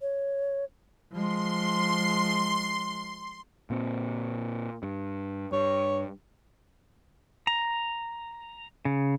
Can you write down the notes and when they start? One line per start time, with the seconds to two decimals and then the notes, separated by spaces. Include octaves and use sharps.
0.01 C#5
1.13 F3 G#3 C6
3.70 A#2 C4
4.83 G2
5.52 G2 C#5
7.47 A#5
8.85 C#3